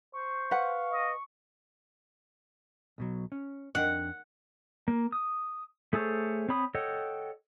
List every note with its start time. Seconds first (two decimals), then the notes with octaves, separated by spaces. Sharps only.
0.13 C5 C#6
0.51 B4 F5 F#5
0.91 D#5
2.98 B1 B2 F#3
3.32 C#4
3.75 F2 D4 F#5 G5
4.88 A#3
5.12 D#6
5.93 A3 G#4 A4 C5 C#5
6.49 C4 C#5 B5 D#6
6.75 A4 C#5 D#5 F#5 G5